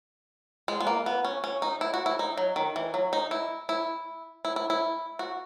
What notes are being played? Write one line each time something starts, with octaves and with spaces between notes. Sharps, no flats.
G#3
B3
A#3
B3
C#4
C#4
D#4
E4
F#4
E4
D#4
F#3
D#3
E3
F#3
D#4
E4
E4
E4
E4
E4
F#4